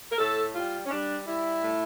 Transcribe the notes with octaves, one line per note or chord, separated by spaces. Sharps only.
A#4
A2 A4
G3 F4
C#4
G3 D4
G3 E4
A2